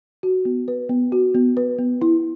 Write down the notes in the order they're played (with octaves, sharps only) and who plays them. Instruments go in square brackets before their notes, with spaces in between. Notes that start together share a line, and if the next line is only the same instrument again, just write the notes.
[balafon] F#4
B3
B4
B3
F#4
B3
B4
B3
E4